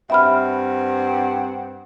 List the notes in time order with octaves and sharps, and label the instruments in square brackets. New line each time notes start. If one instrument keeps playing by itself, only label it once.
[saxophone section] G2 C4 F#5 [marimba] E5 B5 F6